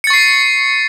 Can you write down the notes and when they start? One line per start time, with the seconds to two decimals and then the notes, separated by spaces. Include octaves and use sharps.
0.04 C#7
0.07 A6
0.10 C#6
0.13 C7